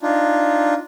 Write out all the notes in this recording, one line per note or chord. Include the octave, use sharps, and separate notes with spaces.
D4 D#4 F4